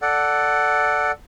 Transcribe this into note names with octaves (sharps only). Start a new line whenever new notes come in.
A4 D5 F#5